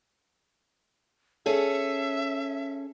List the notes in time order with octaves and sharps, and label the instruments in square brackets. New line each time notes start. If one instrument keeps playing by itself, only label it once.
[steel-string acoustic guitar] C#4 G#4 A4 [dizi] E5